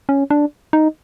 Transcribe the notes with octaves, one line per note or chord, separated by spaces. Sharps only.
C#4
D4
D#4